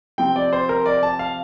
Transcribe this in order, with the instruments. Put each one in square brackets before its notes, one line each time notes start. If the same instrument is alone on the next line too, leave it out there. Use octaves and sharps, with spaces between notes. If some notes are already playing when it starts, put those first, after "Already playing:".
[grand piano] C3 F3 C4 G5
D5
C5
A#4
D5
A5
F5